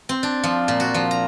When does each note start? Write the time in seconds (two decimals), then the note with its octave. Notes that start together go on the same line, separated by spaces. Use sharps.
0.09 C4
0.23 D4
0.43 F3
0.68 A#2
0.80 F#4
0.94 F3
1.11 A#5